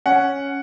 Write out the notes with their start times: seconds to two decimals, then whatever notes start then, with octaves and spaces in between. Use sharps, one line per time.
0.06 C#4 F#5